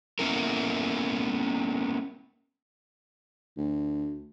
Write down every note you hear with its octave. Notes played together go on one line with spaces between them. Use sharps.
A#3 B3 C#4 E4 A#4
D2